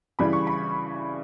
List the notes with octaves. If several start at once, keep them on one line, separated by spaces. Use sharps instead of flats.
C#3 E3 G3 B5
C#6
B5